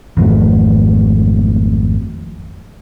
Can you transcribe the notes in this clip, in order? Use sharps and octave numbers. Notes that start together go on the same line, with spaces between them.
G#1 F2 F#3 A3